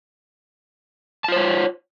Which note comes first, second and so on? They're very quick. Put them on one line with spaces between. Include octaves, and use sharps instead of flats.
A5 F4 C5 C#5